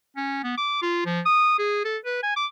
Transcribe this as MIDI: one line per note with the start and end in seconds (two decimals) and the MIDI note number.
0.17 0.43 61
0.44 0.53 59
0.58 0.78 86
0.82 1.03 65
1.06 1.20 53
1.26 1.54 87
1.59 1.82 68
1.85 1.97 69
2.05 2.18 71
2.23 2.35 80
2.36 2.46 86